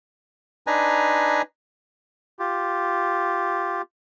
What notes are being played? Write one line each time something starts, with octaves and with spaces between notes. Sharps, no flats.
D4 D#4 B4 G#5 A#5
F4 G4